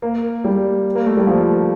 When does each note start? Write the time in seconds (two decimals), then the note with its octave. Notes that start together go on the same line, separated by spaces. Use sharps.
0.02 A#3
0.44 G3
0.95 A#3
1.06 A3
1.17 G3
1.27 F3